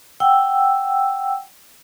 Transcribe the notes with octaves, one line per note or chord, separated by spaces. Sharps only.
F#5 G5 E6